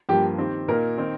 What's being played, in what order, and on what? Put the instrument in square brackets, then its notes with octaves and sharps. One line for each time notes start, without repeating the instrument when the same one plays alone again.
[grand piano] G2 F3 A#3 [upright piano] G4
[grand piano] D#3 C4 G4
[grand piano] A#2 A#3 D#4 [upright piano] A#4
[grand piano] D#3 C4 D#4